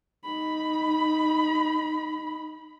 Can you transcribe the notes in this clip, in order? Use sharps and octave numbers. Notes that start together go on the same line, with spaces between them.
D#4 B5